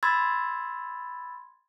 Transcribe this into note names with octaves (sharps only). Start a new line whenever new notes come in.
B5 C6 E6 G#6 A6